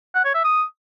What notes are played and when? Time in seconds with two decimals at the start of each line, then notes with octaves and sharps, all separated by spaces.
0.15 F#5
0.25 C#5
0.34 E5
0.44 D#6